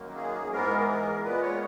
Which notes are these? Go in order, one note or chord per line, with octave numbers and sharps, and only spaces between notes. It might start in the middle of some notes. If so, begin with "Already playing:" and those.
Already playing: F#2 D#3 F#3 A#3
G#4
G#2 E3 G#3 B3 A#4
G#4
A#4
A#2 G#3 B3 B4
C#5